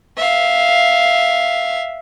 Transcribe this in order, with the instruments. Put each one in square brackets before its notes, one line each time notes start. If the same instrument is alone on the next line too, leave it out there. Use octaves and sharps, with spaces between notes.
[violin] E5 F5